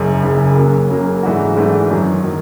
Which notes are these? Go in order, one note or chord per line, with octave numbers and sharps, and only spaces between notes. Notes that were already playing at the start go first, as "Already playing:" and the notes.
Already playing: F#1 F#2 C#3
F#1 F#2 C#3
C#3 F#3 A#3
C#3 F#3 A#3
G#2 E3 A3 D4 F#4
G#2 E3 A3 D4 F#4
F#2 D#3 F#3
D#3 F#3